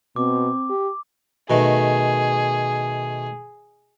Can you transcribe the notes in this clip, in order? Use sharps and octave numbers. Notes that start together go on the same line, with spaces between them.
B2 C4 D6
G4
B2 D#3 A3 G#4